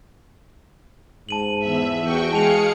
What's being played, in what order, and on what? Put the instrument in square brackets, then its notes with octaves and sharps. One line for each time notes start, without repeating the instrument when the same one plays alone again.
[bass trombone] G#2 [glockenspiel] A5 D#7 F#7
[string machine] E2 E5
[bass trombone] E2 [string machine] F#4 G5 C#6
[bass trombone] G#3 [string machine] G#4 F5 C#7 [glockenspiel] A5 F7